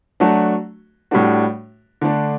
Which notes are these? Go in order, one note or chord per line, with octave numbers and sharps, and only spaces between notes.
F#3 A3 D4 F#4
A2 G3 D4 F#4
D3 A3 D4